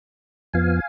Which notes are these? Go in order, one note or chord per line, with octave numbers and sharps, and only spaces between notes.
F2 F3 B3 F5 G#5